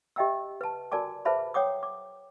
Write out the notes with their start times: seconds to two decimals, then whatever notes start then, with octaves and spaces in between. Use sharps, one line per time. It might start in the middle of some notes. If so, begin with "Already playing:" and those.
0.16 G4 D#5 E5 G5 A#5 E6
0.61 B4 A5
0.92 F#4 A#4 D5 G#5 A5 D6
1.25 G#4 B4 C5 E5 A5 B5
1.54 C#5 F#5 G5 D6 D#6
1.83 D6